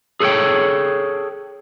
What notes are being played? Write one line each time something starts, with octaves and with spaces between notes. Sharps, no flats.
G#4 A4 B4 C#5 G5